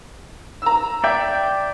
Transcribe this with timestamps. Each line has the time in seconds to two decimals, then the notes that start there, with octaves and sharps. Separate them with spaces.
0.62 A#5 E6
1.04 D5 E5 G5